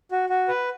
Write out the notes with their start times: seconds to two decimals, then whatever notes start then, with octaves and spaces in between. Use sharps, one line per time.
0.12 F#4
0.29 F#4
0.48 B4